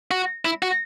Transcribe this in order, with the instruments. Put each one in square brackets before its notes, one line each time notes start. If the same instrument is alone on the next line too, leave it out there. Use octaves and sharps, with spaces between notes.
[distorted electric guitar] F#4
E4
F#4